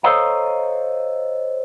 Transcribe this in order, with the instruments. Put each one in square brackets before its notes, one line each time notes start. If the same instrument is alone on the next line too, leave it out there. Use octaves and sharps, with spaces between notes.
[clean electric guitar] A4 C5 C#5 D#5 F5 A#5